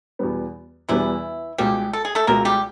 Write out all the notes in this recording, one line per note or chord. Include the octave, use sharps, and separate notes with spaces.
E2 B2 G3 B3
E2 B2 E3 G3 B3 E4
C#2 B2 G3 G#3 G4
A4
G#4
A3 A4
C#2 B2 G#3 A#3 A#4
G3 G4